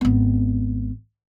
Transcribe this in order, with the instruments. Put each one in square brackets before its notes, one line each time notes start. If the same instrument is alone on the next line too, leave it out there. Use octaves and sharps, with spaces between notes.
[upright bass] G#1 B3